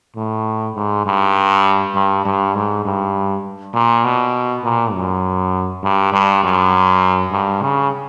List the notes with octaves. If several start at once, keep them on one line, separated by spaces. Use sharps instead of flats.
A2
G#2
G2
G2
G2
G#2
G2
A#2
B2
A#2
F#2
G2
G2
F#2
G2
C#3